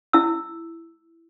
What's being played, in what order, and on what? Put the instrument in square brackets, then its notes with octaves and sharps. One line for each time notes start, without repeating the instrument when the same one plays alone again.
[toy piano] E4 E6